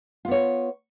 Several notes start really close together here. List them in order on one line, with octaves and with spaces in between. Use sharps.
F4 B3 C#5